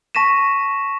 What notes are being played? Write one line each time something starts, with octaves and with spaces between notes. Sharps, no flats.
A5 C#6 A#6 B6 D#7 E7